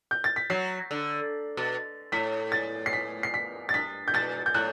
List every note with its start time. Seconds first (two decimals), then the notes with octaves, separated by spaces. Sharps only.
0.11 G6
0.24 A6
0.36 B6
0.50 F#3 C7
0.91 D3
1.57 B2
2.12 A2 B6
2.52 A6
2.86 C7
2.93 B6
3.23 C7
3.34 B6
3.69 A6
3.74 G2 B6
4.08 G6
4.14 B2 A6
4.46 G6
4.54 A2 F#6